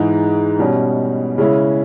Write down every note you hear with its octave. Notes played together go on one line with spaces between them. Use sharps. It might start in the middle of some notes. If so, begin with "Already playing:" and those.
Already playing: G#2 E3 G#3 D#4
B2 G3 C#4
C#3 G#3 C#4 E4